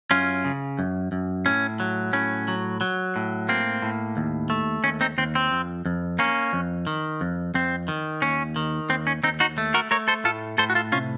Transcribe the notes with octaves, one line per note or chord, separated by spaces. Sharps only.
F#2 C#4 F4
C#3
F#2
F#2
A2 C#4
F#3
A2 C#4
F#3
F#3
A2
A#3 C4
A2
D#2
A3
D#2 C#4
C4 D#4
D#2 C4
C4
F2
F2
A#3 C#4
F2
D#3
F2
F2 C4
D#3
D#2 C#4
D#3
D#2 C4
C#4
D#2 C4 D#4
D#4 F#4
A3
F#4 A#4
A3 A#4 C#5
A4 C5
A2 F4 A4
A2 A4 C5
F#4
F4 A4
C3 C#4 F4